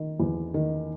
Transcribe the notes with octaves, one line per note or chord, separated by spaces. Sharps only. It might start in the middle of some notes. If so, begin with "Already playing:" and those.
Already playing: D#3
E2
D#3